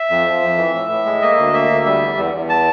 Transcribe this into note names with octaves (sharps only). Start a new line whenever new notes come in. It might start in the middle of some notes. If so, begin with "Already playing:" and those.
Already playing: E5
F2
F3
F2
E3
A2
A2
G#3
A#3 D#5
D2
A#3 E5
D2
G3 E5
E2
E2
E2
A5